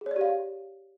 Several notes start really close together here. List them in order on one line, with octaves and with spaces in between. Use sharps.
G#4 C#5 D5 G4 F5